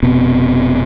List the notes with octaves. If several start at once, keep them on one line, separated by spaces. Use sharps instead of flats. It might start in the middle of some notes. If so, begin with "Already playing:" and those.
F1 B2 B3 C4